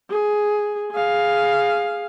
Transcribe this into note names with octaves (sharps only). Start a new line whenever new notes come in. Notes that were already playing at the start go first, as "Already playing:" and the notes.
G#4
G#4 F5